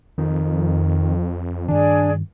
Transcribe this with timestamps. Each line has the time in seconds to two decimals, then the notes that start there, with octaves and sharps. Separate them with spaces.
0.18 F2 D#3
1.68 G2 D#3 D4 G#4 D5 G#5